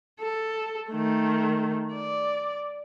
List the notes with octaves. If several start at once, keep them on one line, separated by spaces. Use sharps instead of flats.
A4
D#3 A3
D5